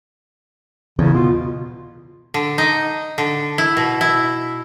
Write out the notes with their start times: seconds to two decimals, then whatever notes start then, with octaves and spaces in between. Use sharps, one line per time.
0.99 E2 C#3
1.15 B2 F4
2.34 D3
2.58 D#4
3.18 D3
3.58 E4
3.77 B2
4.01 E4